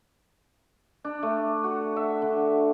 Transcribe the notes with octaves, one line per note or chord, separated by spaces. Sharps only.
D4
A3
F#4
E5
D3